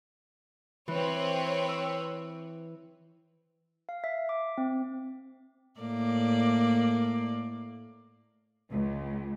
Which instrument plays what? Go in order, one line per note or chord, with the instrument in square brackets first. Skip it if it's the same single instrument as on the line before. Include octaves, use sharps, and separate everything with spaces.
[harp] E3 [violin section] C4 B4 C#5
[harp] E6
[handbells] F5
E5
D6
C4
[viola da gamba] A2 A#3 D5
[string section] C#2